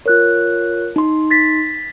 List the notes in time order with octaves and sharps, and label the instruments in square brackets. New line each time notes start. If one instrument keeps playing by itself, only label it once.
[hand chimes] F4 C#5 [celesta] A#4 F#6
[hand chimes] D#4 C6
[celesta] A6 B6